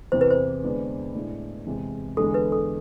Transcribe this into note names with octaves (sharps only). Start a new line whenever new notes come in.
E2 C3 E3 C5
B4
C5
D3 G#3 B3 D4
A2 G#3 D4
E2 C3 G#3
E2 D3 G#3 A4
B4
A4